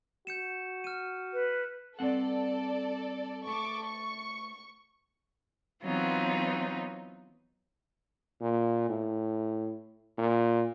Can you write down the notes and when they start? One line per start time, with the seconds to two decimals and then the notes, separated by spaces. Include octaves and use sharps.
0.27 F#4 G6 C#7 E7
0.84 F6 D#7
1.33 B4
1.99 G2 C4 A4 D5 F#5
3.48 A3 A4 C#6 D6
3.85 C#6 C#7
5.84 E3 F#3 B3 C4 D#4 F4
8.41 A#2
8.89 A2
10.18 A#2